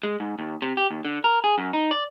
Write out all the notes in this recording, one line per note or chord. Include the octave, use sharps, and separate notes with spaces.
G#3
G#2
D#2
C3
G4
D#2
D3
A#4
G#4
F#2
D#4
D5